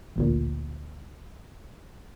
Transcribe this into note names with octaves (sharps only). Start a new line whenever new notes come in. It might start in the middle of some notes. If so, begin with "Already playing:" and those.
A1 D2 A#2